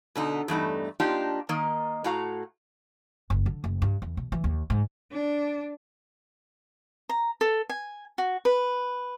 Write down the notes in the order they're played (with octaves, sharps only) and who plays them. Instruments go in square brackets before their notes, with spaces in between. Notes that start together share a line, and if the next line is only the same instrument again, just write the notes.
[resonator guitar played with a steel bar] B2 D3 D#4
E2 G2 A3 D#4
A#3 D4 D#4 F4 G4
D#3 A#3 D#5
A2 F#4 F5 A#5
[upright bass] F#1
D3
F#1
G2
E2
B2
E3
D#2
G#2
[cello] D4
[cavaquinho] A#5
A4
G#5
F#4
B4